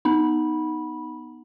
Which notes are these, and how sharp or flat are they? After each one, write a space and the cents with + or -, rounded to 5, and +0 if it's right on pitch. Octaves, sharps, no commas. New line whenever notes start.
B3 -5 D#4 +0 B5 -15